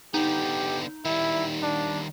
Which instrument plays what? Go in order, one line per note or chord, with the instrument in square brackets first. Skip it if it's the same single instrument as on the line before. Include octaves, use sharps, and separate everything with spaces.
[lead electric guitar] D3 B3 [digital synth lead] D#4 [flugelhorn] G4
[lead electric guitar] D#3 G3 [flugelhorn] E4
[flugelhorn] D4